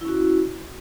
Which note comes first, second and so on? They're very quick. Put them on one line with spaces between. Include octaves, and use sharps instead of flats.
E4 C#4 F#4